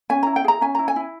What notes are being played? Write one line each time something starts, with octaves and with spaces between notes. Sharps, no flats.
C#4 G#5
E4 A#5
G5
G#4 A#5
C#4 G#5
E4 A#5
G#5
E4